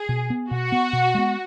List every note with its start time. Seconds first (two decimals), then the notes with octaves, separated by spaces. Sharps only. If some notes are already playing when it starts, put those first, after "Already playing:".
Already playing: G#4
0.09 B2
0.30 B3
0.51 B2 F#4
0.72 B3
0.93 B2
1.15 G#3 B3